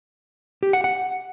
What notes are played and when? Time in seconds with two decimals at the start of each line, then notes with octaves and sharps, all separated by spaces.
0.63 G4
0.73 F#5
0.84 F#5